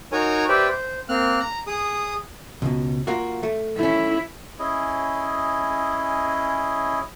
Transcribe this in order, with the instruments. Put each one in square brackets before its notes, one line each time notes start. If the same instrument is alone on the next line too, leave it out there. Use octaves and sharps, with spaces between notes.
[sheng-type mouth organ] D#4 F#4 A#4 C#5 G#5 A#5
G4 B4 C5 D5 E5 G5
C5
A#3 C4 F6 F#6
A#5
G#4 D#6
[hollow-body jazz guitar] C#2 B2
A#3 F4 F#4
A3
[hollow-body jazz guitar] A3 C#4 [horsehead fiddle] E4
[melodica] C#4 E4 G#4 D#5